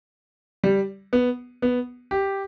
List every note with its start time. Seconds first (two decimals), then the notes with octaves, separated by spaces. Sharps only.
0.64 G3
1.13 B3
1.62 B3
2.11 G4